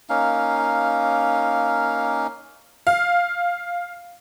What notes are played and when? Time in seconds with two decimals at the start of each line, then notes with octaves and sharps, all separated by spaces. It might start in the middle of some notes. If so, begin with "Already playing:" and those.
0.09 A#3 C#4 D#4 F5
2.87 F5